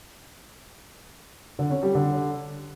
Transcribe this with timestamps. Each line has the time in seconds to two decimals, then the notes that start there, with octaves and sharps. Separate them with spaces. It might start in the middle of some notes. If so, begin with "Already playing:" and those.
1.59 D3
1.71 C#4
1.83 G3
1.95 D3